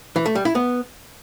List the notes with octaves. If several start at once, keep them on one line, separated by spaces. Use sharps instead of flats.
E3
A3
G3
E4
B3